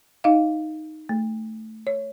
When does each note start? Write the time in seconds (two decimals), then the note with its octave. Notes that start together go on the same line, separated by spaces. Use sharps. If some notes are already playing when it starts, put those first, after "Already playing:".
0.24 D#4 D#5 F5
1.09 A3
1.87 C#5